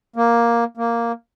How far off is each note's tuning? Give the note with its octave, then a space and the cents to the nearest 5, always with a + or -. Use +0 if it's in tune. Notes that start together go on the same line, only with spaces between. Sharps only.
A#3 +5
A#3 +0